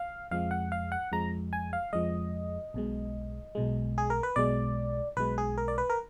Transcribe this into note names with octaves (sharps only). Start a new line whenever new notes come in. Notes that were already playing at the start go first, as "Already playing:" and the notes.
Already playing: F5
F2 F3 G#3 F5
F#5
F5
F#5
F2 F3 G#3 A#5
G#5
F5
F2 F3 G#3 D#5
B1 B2 G#3
B1 B2 G#3
G#4
A#4
B4
B1 B2 G#3 D5
B1 B2 G#3 B4
G#4
A#4
D5
B4
A#4